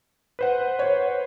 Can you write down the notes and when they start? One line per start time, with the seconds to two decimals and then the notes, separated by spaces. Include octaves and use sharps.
0.39 B4 C5 F#5
0.79 C#5